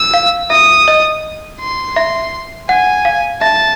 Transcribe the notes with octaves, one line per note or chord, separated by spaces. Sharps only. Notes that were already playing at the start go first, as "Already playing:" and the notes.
Already playing: E6
F5
E5 D#6
D#5
C6
E5
F#5 G#5
F5
E5 A5